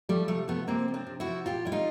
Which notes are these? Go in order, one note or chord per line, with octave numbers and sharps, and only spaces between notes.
F3 G3 A3
C3 G3 A3
F3 A3 B3
C3 A#3 C4
F3
C4 D4
C3
E4 F#4
F3
A#2 F4 G4
G3 E4
D#4 F4